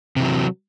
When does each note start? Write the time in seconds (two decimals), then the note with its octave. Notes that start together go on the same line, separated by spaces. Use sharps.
0.16 C3
0.20 E3
0.24 F#3